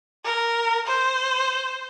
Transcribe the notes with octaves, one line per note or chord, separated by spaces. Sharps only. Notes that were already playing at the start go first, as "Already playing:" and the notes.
A#4
C5